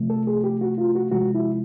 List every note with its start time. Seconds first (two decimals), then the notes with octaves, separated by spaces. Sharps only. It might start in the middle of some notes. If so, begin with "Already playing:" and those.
Already playing: C3 F3 A3
0.10 A4
0.27 G#4
0.44 G4
0.61 F#4
0.78 F4
0.95 F#4
1.11 C3 F3 G#3 F#4
1.35 E4